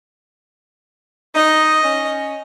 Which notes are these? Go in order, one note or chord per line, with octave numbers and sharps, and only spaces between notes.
D#4 D#5
C#4